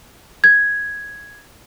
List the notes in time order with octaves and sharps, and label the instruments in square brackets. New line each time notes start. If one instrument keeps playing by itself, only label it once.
[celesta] G#6